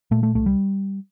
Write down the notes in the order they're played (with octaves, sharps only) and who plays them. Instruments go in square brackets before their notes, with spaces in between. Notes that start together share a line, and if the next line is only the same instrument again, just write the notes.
[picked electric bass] A#2 A3
A3
C2 A3
G3